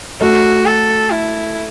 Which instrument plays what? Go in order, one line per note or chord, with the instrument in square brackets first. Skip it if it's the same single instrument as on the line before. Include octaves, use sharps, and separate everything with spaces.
[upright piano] A3 [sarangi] F#4
[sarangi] A4
E4